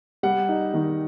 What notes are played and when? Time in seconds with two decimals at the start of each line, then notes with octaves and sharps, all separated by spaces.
0.23 G3 F#5
0.49 D#4
0.74 D#3